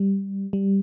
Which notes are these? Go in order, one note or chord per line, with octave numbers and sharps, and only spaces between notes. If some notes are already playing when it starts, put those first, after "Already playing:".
Already playing: G3
G3